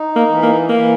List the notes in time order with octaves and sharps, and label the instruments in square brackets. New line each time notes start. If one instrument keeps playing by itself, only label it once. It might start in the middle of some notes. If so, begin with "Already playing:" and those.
Already playing: [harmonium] D#4
[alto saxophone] A#3
[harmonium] E3
[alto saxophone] A#3
[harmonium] E3 [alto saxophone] A#3